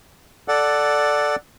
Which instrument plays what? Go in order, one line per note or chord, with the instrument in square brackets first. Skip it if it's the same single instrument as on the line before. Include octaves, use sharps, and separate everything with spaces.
[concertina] A4 D5 F#5